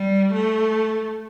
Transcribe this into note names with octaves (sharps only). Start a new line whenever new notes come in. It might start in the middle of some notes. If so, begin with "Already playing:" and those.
Already playing: G3
A3